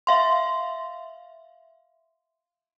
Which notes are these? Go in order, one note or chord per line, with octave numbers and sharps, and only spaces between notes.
E5 F5 C6